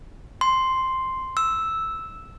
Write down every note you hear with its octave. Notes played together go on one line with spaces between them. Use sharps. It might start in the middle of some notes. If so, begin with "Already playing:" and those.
C6
E6